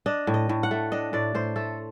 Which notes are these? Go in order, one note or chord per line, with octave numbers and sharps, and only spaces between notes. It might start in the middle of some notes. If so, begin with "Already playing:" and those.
D4 D#5
A2
D#5
A2
F#5
A3
D4 D#5
A2 D5
A2 C5
A3 A4